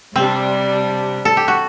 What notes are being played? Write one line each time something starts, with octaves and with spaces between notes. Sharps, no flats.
C3 G3 C4 D4
A4
G4
F#4